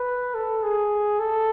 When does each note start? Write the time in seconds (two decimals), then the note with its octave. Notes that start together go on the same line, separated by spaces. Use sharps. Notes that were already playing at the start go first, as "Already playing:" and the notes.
Already playing: B4
0.35 A4
0.63 G#4
1.19 A4